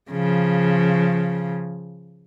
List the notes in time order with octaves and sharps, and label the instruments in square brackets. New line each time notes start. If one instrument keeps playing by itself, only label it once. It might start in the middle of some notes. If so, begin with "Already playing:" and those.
[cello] C#3 F3